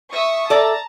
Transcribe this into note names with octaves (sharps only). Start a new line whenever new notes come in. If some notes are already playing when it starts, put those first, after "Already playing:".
E5 C#6 D#6
A4 D5 E5 A5 A#5